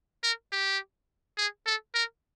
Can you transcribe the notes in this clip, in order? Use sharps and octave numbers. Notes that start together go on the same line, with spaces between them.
A#4
G4
G#4
A4
A#4